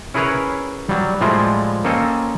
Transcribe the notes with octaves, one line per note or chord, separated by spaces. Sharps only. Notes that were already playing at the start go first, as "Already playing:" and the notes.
C#4 E4 G#4 A#4 B4 C#5
F#3 G3
A2 F3 G3 G#3 E4 F4
A#3 C4 C#4 A4 D#5